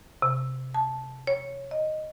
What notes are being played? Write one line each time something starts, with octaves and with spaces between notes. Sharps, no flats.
C3
A5
C#5
D#5